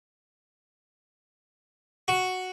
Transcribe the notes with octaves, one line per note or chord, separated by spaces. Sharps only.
F#4